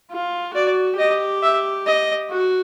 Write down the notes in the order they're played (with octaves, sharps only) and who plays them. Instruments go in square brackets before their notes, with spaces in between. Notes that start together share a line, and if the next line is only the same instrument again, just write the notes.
[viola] F4
[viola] F#4 [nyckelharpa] D5
[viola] G4 [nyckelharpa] D#5
[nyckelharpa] E5
D#5
[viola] F#4